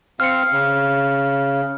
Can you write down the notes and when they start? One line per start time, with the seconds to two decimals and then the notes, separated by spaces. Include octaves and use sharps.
0.20 C4 F5 F6 C#7
0.52 C#3